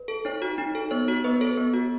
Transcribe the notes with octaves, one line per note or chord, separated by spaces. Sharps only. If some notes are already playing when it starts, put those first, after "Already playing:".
Already playing: B4
A4
D#4 C#5
F#4
D#4
A4
B3 C#5
F#4 C#5
B3 B4
A4 C#5
B3
F#4